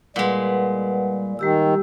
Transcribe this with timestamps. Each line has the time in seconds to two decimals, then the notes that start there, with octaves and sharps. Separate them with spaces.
0.16 A#2 G3 G#3 B4 F#5
1.39 D#3 G3 G4 E6